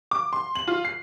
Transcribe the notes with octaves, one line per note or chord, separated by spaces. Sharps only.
D6
C6
F#7
F4
C7